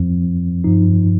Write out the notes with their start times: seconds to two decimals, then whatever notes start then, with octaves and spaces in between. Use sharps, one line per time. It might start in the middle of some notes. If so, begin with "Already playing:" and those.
Already playing: F2 F3 C4
0.64 G2 F3 D#4